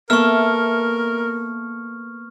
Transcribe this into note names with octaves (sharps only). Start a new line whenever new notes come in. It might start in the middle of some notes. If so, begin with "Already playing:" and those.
A#3 B3 A4 A#4 E5 C#6 F6